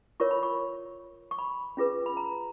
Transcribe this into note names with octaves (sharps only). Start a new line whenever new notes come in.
F4 A#4 C#5 C#6
B5
C#6
C#6
B5
C#4 F4 G#4 B4
B5
A#5